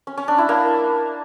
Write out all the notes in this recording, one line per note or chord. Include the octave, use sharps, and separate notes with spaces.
C#4
C#4
D4
E4
A#3